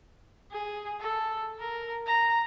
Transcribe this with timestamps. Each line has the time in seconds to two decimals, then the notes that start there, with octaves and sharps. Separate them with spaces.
0.51 G#4
1.00 A4
1.59 A#4
2.06 A#5